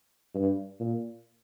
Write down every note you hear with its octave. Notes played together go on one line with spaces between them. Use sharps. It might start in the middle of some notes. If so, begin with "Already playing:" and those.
G2
A#2